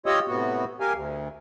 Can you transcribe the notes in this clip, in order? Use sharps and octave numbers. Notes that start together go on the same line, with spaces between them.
F4 G4 C#5 D#5 D#6 E6
A2 C3 B3 F#4
G4 A#4 F5 G#5
D2